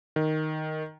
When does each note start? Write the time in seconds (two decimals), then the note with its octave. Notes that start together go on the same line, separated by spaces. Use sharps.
0.16 D#3